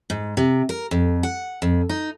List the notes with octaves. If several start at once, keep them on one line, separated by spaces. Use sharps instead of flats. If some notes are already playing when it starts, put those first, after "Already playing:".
G#2
C3
A#4
F2
F#5
F2
D#4